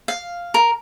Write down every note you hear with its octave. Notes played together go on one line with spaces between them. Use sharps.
F5
A#4